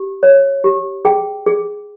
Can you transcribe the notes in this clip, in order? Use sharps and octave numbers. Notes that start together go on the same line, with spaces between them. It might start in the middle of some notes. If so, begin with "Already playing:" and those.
Already playing: G4
C#5
G4
G#4 G5
G#4